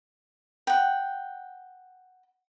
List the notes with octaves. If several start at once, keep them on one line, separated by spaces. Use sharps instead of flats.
F#5 G5